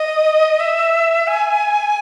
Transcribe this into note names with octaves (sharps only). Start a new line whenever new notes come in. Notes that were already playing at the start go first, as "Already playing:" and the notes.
Already playing: D#5
E5
G#5